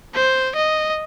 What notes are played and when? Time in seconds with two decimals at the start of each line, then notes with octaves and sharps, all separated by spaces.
0.15 C5
0.55 D#5